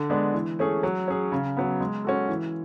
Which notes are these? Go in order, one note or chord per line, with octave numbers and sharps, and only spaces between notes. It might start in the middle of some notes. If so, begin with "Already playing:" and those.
Already playing: D3
G#3 B3 D4
E3
A3 C#4 G#4
F#3
C#4 G#4
C#3
F#3 B3
G#3
C#4 F#4 A4
E3